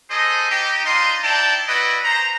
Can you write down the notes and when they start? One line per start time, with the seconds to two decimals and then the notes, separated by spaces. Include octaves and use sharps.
0.10 D#4 G#4 A4 C5 D#5
0.50 D#4 G4
0.84 D4 D#4 F4 D#5 C6
1.23 D#4 E4 D5 G5 A5
1.68 E4 F#4 B4 D5 D#5
2.03 C5 A#5